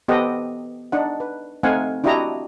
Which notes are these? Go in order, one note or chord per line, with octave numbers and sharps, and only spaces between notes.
B3 G4 A4 C5 D#5 F#5
D4 D#4 D5 F#5
B4
A3 C4 D#4 F5 F#5 G#5
D4 E4 F#4 G4 D#5 A#5